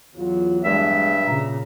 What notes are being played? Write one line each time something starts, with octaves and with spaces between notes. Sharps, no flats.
E2 F#3 F4
G2 G#3 E5
A#2 C#3 A#5